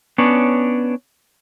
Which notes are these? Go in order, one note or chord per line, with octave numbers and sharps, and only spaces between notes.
B3 C#4 D4 C#5